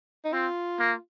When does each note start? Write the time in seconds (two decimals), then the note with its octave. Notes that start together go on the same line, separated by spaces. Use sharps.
0.25 D#4
0.33 C4 F4
0.79 A#3